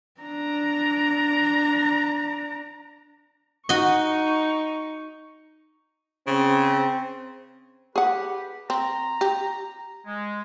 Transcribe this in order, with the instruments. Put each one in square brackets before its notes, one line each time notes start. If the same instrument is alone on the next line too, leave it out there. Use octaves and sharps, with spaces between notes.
[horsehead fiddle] D4 A#5
[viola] D#4 C#6 [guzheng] F#4 D#5
[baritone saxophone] C#3 [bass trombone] C4
[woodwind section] G4 B4 [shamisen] G#4 F#5
[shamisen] C4 [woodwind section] A#5
[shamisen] G4
[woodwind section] G#3